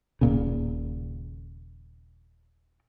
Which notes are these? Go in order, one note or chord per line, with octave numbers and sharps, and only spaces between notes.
D#1 A#2 C#3